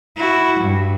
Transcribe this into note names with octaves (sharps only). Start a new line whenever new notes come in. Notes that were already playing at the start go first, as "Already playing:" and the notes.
E4 F#4
G2